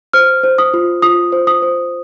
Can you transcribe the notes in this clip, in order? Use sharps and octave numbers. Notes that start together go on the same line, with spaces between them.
C5 F6
C5
D#6
F4
F4 D#6
C5
D#6
C5